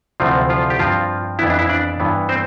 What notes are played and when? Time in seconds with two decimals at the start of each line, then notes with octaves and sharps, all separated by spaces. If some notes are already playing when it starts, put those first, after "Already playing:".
0.20 D2 C3 E3 F3 A3 C4 F4
0.49 F3 F4
0.70 G4
0.79 G2 F3 C4 F4
1.39 F2 E3 B3 E4
1.50 D4
1.59 E4
1.69 D4 D5
2.00 G2 E3 B3
2.29 C4 C5